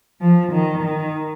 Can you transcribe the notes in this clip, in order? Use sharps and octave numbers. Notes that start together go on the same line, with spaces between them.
F3
D#3
D#3